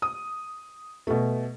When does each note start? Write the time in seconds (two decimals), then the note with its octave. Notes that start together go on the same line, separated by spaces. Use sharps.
0.02 D#6
1.07 B2 A3